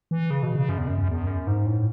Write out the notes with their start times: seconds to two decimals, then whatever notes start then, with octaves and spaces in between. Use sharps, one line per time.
0.11 E3
0.30 C#3
0.43 B2
0.56 C#3
0.69 F#2
0.78 E2
0.87 F#2
0.98 F#2
1.09 E2
1.27 F#2
1.47 G#2
1.66 A2